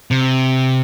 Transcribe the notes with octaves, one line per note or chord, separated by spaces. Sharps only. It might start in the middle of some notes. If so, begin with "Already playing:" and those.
C3